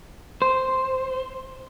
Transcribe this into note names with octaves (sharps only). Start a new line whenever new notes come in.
C5